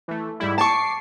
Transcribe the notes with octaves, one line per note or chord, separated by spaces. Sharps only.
E3 A3
G#2 G3 E4
A5 C#6 D6 C7